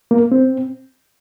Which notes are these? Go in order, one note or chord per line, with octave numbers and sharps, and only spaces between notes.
A#3
C4